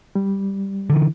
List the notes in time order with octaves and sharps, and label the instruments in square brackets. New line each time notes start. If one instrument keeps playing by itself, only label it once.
[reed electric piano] G3
[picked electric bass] D3 E3